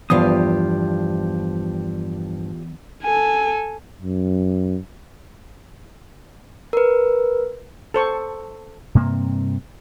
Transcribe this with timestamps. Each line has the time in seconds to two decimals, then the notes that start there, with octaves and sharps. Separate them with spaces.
0.10 E2 G2 F3 F4 G4 F5 D#6
3.03 A4 G#5
4.02 F#2
6.73 A#4 B4
7.94 A4 C5 C#6
8.95 G2 C3 A#3 C4